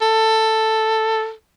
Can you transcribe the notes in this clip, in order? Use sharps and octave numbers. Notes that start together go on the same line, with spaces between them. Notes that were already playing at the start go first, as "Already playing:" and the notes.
A4